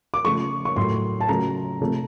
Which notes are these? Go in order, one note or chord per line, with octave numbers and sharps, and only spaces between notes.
D6
C#3 F3 A3 C#6
C#6
A2 F#3 A3 C6
A5
C#3 F#3 A3 A#5
C3 F3 A3